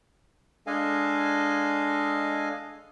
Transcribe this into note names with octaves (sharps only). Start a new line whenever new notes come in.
G#3 D4 A4 D#5 F5 G#5